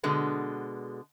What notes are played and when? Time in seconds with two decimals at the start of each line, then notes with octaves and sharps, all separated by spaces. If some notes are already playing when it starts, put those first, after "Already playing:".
0.03 B2 D3 G#3 B3